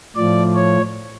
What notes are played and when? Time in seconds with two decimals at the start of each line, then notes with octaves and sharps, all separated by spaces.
0.16 A2 F3 D5
0.55 C#5